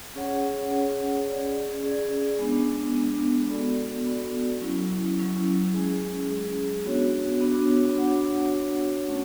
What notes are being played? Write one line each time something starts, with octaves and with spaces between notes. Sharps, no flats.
C#4 G#4 C#5 F#5
C#4 G#4 C#5 F#5
C#4 G#4 D5
C#4 G#4 D5
G#3 B3 D4
G#3 B3 D4
B3 F#4 A4 D5
B3 F#4 A4 D5
F#3 C#4 E4
F#3 C#4 E4
G#3 C#4 G#4
G#3 C#4 G#4
B3 D4 F#4 C#5
B3 D4 F#4 C#5
D4 F#4 C#5 F#5
D4 F#4 C#5 F#5
A3 C#4